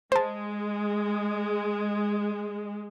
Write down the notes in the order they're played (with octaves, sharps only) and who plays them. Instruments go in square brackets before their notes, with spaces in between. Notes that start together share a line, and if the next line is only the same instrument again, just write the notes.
[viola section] G#3 [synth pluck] C5 A5